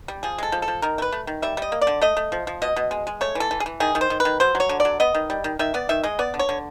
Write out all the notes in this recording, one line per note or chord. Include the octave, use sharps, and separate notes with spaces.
G3
F3 G#4
G#3 A4
F3
A4
F3
D#3 A#4
A3
B4
A3
D#3
G3 E5
G3 D#5
A#3
D5
D3
A3 D#5
A3
F3
F3
B2 D#5
B2
G#3
G#3
A3 C#5
E3 A4
E3
G#4
E3
D#3 G#4
D#3
C5
D#3
B4
D#3
F#3 C5
F#3
C#5
D3
D5
F#3
B3 D#5
D#3
G3
D#3
D#3 E5
B3 D5
D#3 E5
G#3 D#5
B3 D5
D3
C#5
D3